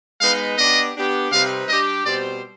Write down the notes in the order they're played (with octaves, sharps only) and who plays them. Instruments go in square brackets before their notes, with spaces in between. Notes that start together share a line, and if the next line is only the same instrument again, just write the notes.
[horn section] G#3 B3 D#4 B4 [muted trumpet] F5
[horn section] B3 D4 G4 [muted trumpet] D#5
[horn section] B3 D4 G4
[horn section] C3 G3 C4 D#4 B4 [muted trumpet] F5
[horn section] G3 D4 G4 D5 [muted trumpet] D#5
[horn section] B2 G3 C4 G4 C5 [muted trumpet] D5